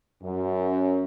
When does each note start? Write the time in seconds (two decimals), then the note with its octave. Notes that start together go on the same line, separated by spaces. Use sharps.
0.23 F#2